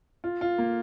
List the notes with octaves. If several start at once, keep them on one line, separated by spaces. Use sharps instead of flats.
F4
F4
A#3